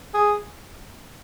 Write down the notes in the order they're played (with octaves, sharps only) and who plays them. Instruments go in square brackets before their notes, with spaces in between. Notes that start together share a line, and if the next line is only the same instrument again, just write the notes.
[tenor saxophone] G#4